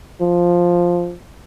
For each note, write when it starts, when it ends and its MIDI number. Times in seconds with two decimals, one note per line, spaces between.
0.21 1.15 53